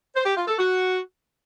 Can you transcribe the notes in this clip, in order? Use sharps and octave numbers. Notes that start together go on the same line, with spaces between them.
C5
G4
F4
A4
F#4